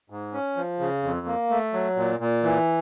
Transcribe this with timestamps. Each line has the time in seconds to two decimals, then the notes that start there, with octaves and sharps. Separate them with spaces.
0.10 G#2
0.33 C#4
0.57 F3
0.79 C#3
1.03 F2
1.26 A#3
1.50 A3
1.73 F#3
1.96 A#2
2.20 A#2
2.43 E3